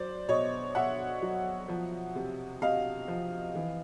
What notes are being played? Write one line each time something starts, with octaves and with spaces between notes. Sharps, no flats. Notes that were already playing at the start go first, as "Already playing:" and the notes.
Already playing: F#3 C5 D5
B2 C#5 D#5
B2 E5 F#5
F#3
F3
C3
C3 D#5 F5
F3
E3